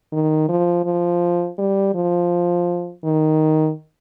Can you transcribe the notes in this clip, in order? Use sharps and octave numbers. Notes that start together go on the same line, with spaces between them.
D#3
F3
F3
G3
F3
D#3